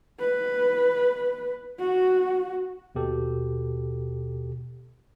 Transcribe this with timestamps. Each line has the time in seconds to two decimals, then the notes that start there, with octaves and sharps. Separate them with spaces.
0.19 B4
1.79 F#4
2.95 D#2 B2 G4 A4